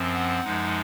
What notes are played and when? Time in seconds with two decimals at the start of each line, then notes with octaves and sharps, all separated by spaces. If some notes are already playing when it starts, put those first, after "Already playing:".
Already playing: F#2 F3 C4
0.14 F#5
0.43 F#2 F3 G#3 D#4